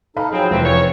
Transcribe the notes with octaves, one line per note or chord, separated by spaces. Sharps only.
D#4 A4 F5 B5
F3 F#3 C4 G#4
F1 D#2 E3 A#3 C4
C#5